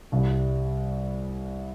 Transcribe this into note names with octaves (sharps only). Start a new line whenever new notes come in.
C2 C3 G3